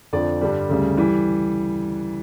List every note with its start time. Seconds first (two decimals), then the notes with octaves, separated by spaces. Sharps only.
0.13 F2 D3 F3 D5
0.41 G2 D3 G3
0.69 D2 C#3 G3
0.97 E3 G3